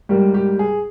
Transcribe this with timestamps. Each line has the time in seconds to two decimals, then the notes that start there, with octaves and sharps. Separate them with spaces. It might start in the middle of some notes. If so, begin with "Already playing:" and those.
0.09 G#2 G3 A#3 G4
0.34 G4
0.59 G#4